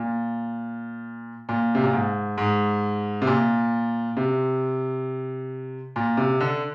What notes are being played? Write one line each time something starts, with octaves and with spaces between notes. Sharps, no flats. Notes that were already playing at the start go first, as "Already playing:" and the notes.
Already playing: A#2
A#2
C3
A#2
G#2
G#2
C3
A#2
C3
A#2
C3
D3